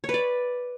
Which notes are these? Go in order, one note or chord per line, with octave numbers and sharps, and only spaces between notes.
C#5
B4
D5